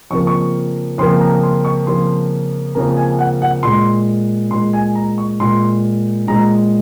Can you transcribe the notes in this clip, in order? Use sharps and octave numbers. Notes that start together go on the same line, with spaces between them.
F2 C#3 F3 A#3 C#6
C#6
F2 C#3 F3 A#3 C6
A#5
C6
C#6
F2 C#3 F3 A#3 C6
F2 C#3 F3 A#3 A#5
G#5
F#5
F#5
A#2 G#3 C6
A#2 G#3 C6
G#5
A#5
C#6
A#2 G#3 C6
A#2 G#3 A#5